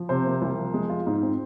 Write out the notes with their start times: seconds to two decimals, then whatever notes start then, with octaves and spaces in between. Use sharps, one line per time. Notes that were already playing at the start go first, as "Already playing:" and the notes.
Already playing: F3
0.09 C3 C5
0.26 A#3
0.42 C2
0.59 F3
0.74 G#3
0.90 F4
1.07 G#2
1.23 C4